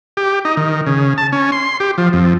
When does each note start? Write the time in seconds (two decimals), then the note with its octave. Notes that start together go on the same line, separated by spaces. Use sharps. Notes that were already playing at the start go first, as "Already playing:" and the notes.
0.17 G4
0.45 D#4
0.57 D#3
0.86 C#3
1.18 A5
1.33 C#4
1.52 C6
1.80 G4
1.98 F3
2.13 F2